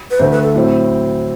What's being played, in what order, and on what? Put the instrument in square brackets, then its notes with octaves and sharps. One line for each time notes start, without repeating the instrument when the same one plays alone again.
[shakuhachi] B4
[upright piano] D2 D3 A3 [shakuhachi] C5
[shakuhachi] B4
A4
[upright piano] A2 F#3 C4